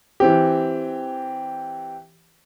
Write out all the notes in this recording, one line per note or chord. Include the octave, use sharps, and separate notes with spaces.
E3 C4 G4